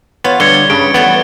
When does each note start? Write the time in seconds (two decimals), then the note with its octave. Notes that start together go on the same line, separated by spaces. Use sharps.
0.24 B3 F4 C#5
0.40 D3 G3 G#6 C#7 G7
0.70 G2 C#3 D7
0.94 E3 G3 A3 B3 D7